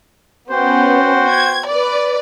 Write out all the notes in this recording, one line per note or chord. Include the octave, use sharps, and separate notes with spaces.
B3 C#4 F#4 C5 G5
G#6
B4 D5